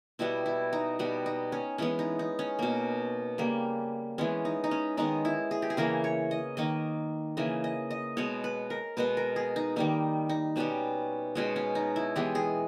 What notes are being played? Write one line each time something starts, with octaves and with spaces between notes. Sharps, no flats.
B2 G3 B3 E4
E4
D#4
B2 G3 B3
D#4
C#4
E3 G#3 B3 C#4
D#4
D#4
C#4
B2 A#3
C#3 G3 A#3
E3 G#3 B3 C#4
D#4
D#4
C#4
D#3 G#3 B3 D#4
E4
G#4
G4
G#4
C#3 E3 A#3 A#4
C#5
D#5
D#3 A#3 D#5
C#3 E3 A#3 D#5
D#5
D#5
B2 G#3 B3 C#5
B4
A#4
B2 G#3 B3 B4
A#4
G#4
D#4
D#3 G3 A#3 D#4
D#4
B2 G3 B3 C#4
B2 G#3 B3 C#4
C#4
D#4
E4
E3 G#3 B3 G4
G#4